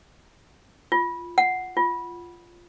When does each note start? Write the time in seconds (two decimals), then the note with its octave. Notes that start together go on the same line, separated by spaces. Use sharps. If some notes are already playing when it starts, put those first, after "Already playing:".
0.92 F4
1.38 F#5
1.77 F4